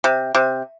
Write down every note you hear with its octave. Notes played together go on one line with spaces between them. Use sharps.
C3
C3